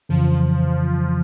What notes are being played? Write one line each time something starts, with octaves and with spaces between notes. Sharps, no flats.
F2 C#3 E3 F3